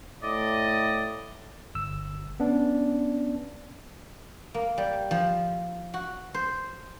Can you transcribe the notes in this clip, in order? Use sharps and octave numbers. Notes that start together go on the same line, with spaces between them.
A2 D5 D#5
G1 E6
B3 C#4 D4
A#3
G3
F3
F#4
C5